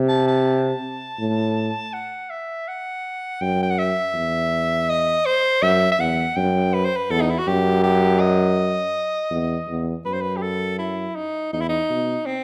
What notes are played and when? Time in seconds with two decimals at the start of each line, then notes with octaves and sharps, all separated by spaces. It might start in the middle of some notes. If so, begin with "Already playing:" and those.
Already playing: C3
0.09 A5
0.28 A5
1.19 A2
1.93 F#5
2.30 E5
2.68 F#5
3.41 F#2 G5
3.63 G5
3.70 F#5
3.78 E5
4.14 E2
4.89 D#5
5.26 C5
5.62 F#2 E5
5.92 E5
5.99 E2 F#5
6.36 F#2 G5
6.74 B4
6.85 C5
6.96 B4
7.10 E2 A4
7.21 D#4
7.30 E4
7.38 F#4
7.47 F#2 G4
7.83 G4
8.20 D#5
9.31 E2
9.68 E2
10.05 F#2 B4
10.13 C5
10.22 B4
10.36 G4
10.42 A4
10.78 E4
11.16 D#4
11.53 E2 D#4
11.61 E4
11.69 D#4
11.90 B2
12.26 C4